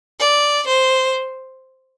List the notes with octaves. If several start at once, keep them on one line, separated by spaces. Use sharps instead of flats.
D5
C5